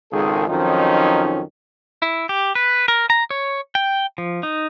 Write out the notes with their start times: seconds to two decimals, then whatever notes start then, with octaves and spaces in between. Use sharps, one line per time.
0.12 G#1 C#2 D#3 G#3 G#4 A4
0.49 F2 D#3 F3 F#3 C#4 D#4
2.02 E4
2.29 G4
2.55 B4
2.88 A#4
3.10 A#5
3.31 C#5
3.75 G5
4.18 F3
4.43 D#4